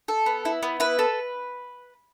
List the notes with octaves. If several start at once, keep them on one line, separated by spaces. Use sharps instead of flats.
A4
B3
E4
B3
E4 B4
A4